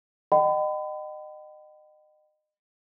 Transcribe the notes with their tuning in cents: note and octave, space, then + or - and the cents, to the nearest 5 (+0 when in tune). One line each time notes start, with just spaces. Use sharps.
D#5 -30 G5 -45 B5 +35